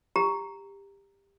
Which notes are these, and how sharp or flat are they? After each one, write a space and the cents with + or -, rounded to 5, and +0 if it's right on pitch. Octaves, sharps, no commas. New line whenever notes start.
G4 +20 A#5 +0